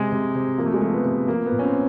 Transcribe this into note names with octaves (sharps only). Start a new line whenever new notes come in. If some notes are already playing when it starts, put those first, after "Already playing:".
Already playing: C3 G#3
C3
C3
F3 A#3
A3
G#3
F3 A3
B3
C3
F3 A#3
B3
A#2
C#4
C4